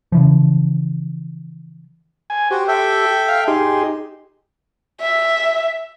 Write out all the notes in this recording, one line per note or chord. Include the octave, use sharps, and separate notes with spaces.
C#3 E3 F3
G#5
F#4 G4 C5
A4 E5 G5
F5
D#4 G4 G#4 C6
E5